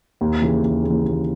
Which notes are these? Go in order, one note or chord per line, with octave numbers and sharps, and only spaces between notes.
D#2
C#3 E3
D#2
C#3 E3
D#2